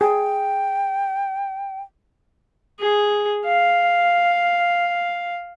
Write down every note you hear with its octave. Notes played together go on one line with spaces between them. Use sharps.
G#4 G5
G#4
F5